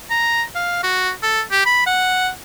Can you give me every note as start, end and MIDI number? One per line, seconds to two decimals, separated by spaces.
0.10 0.43 82
0.55 0.82 77
0.83 1.11 66
1.23 1.41 69
1.51 1.64 67
1.65 1.83 83
1.86 2.29 78